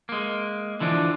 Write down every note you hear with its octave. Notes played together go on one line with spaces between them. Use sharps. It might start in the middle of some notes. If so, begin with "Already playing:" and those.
G#3 A#3
D3 E3 F3 D4